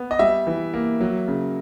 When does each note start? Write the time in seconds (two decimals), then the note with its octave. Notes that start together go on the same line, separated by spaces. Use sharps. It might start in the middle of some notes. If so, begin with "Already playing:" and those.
Already playing: B3
0.11 D#5
0.19 G3 E5
0.47 E3
0.74 A#3
1.00 F#3
1.28 C#3